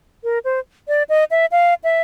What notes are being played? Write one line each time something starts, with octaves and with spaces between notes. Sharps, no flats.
A#4
C5
D5
D#5
E5
F5
E5